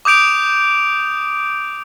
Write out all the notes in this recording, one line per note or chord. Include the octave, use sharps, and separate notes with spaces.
D6 D#6 G6 D7 F7